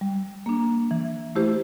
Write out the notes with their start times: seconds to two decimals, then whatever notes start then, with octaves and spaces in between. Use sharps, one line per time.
0.01 G3
0.46 A#3 D4
0.91 E3
1.35 A3 E4 G4 C5